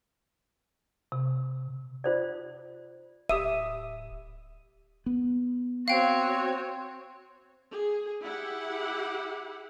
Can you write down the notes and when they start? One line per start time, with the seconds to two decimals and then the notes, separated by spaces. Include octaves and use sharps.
1.12 C3
2.04 F4 C5 D5
3.29 D1 G4 E5 D#6 D#7
5.06 B3
5.88 C4 F#4 C#5 F5 G5
7.72 G#4
8.24 E4 G4 G#4 F#5